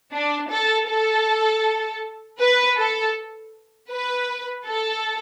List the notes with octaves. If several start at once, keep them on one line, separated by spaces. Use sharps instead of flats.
D4
A4
A4
B4
A4
B4
A4